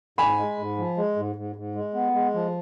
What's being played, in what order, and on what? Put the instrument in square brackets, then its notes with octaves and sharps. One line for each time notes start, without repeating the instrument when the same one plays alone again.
[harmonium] G#2 [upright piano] G#5 B5
[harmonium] G#3
G#2
F3
G#3
G#2
G#2
G#2
G#3
B3
G#3
F3